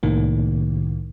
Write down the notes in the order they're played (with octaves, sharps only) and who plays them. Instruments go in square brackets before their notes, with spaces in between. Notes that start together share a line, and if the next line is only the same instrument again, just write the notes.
[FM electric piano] C2 A2 D#3 A#3